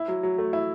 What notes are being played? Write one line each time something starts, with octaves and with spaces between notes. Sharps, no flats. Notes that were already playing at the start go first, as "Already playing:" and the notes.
Already playing: E4
F#3
F#3
A3
E4